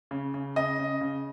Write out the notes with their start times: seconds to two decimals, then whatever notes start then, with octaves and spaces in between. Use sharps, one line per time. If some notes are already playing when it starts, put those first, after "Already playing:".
0.11 C#3
0.34 C#3
0.56 C#3 D#5
0.79 C#3
1.01 C#3